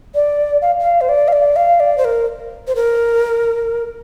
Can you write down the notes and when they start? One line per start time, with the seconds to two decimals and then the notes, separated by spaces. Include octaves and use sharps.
0.15 D5
0.62 F5
0.81 F5
1.01 C5
1.09 D5
1.28 F5
1.33 D5
1.56 F5
1.80 D5
1.98 C5
2.05 A#4
2.67 C5
2.75 A#4